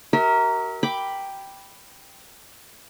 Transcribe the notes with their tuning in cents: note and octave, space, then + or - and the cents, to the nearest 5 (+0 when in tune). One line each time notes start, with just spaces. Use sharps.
F#4 +45 A#4 -5 E5 -35
G5 +0 B5 +0 D6 +0